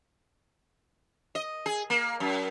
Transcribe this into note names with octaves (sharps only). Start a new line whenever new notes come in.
D#5
G#4
A#3
F#2